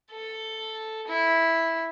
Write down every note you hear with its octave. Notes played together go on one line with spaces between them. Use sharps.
A4
E4